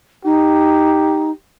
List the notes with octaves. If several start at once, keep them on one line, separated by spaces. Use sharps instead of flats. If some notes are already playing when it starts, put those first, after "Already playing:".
D#4 G4